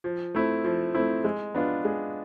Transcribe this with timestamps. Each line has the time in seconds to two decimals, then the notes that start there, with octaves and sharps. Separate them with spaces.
0.04 F3
0.35 A3 C4 E4
0.64 F3
0.95 A3 C4 E4
1.24 G#3
1.55 B3 D4 F4
1.85 G#3